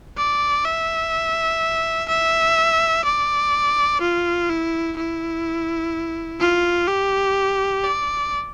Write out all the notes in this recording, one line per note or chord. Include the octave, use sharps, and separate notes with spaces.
D5
E5
E5
D5
F4
E4
E4
F4
G4
D5